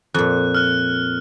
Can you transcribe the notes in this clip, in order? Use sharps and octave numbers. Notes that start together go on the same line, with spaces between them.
F2 A#2 F#6
F6 F#6